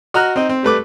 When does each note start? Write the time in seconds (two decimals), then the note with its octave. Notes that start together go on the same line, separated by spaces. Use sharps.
0.14 F#4 D#5 A#5 F6 F#6
0.36 C4 D#4 D#5
0.49 C4
0.63 G3 A3 B4 D6